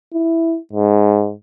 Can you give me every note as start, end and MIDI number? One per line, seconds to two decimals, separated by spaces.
0.13 0.57 64
0.73 1.32 44